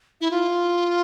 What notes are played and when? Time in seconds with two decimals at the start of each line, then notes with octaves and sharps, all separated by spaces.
0.21 E4
0.31 F4